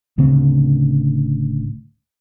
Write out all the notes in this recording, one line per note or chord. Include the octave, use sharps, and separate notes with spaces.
D1 D2 C#3 C4